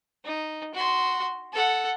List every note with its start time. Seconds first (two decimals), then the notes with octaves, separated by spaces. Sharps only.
0.24 D#4
0.74 F#4 C6
1.53 A4 F#5